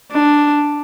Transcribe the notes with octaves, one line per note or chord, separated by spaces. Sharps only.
D4